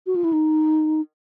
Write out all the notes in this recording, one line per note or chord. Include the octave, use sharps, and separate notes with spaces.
F#4
F4
E4
D#4